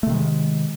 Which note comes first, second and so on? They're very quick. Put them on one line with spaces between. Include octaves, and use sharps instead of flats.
A3 C3 D#3 G#3